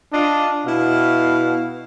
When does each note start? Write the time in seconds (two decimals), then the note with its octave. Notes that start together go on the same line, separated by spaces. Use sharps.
0.13 D4 F4 D#5
0.66 B2 E4 F5